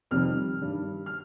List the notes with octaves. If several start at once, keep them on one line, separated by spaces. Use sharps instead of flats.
F2 C3 D#3 G3 F6
G2 D#3 G3
F6